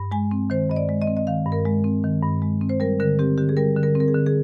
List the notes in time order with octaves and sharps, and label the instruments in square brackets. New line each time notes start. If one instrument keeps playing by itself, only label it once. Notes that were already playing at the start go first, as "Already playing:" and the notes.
Already playing: [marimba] G2
G#3 G#5
C4
D#3 C5
G2 D#5
D5
G#3
D#5
C4
D#5
D#3 F5
G2
A#4
G#3
C4
D#3
G2
G#3
C4
C5
G3 A#4
D3 A#4
C4 G4
D3 G4
G#4
G3 A#4
D3
A#4
C4
A#4
G#4
D3
G#4